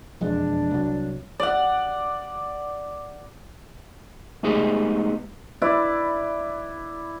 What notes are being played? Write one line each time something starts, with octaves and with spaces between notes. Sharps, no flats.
E1 F2 G#3 D4
C2 F#3
D5 F#5
G#3 A3 B3 D#4 G4 G#4
E4 B4 D5